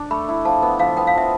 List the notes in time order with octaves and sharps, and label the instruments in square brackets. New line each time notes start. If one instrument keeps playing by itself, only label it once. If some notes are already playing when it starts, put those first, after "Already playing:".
Already playing: [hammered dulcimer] D4
[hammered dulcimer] A3 [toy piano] B5
[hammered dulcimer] E4
[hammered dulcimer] F3 [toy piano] A5
[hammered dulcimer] B3
[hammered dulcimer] F3 [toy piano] F5
[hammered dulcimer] B3 [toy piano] G5
[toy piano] F5
[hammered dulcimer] F3 [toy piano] E5